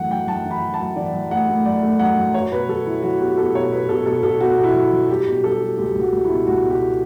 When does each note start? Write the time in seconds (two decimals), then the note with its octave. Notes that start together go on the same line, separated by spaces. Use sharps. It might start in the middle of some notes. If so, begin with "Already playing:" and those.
Already playing: F#2 E3 A3 F#5
0.10 F#2 G5
0.27 F#2 A5
0.45 E3
0.51 B5
0.62 E3
0.74 A5
0.80 F#2
0.96 E3 D5
1.13 F#2
1.31 A3 F#5
1.48 A3
1.65 F#2 D5
1.83 A3
1.99 F#2 F#5
2.17 F#2
2.34 F#3 C#5
2.51 B2 B4
2.68 F#3 A4
2.86 F#3 E4
3.02 F#3 F#4
3.20 B3 G4
3.37 B3 A4
3.54 B2 C#5
3.72 B2 B4
3.89 B2 A4
4.06 B2 A4
4.23 B2 A4
4.41 B3 F#4
4.58 B2
4.63 E4
4.74 F#3
4.92 F#3
5.09 G3 G4
5.27 B2
5.44 G3 A4
5.61 G3
5.77 C#2 G4
5.95 C#2
6.01 F#4
6.12 C#2
6.24 B2 E4
6.47 C#2 F#4
6.64 B2
6.70 G4